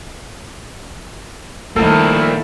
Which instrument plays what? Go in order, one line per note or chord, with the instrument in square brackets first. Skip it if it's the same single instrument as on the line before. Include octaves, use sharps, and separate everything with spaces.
[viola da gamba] D#3 E4 [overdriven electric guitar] F3 A#3 [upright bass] G3 A3 [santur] A4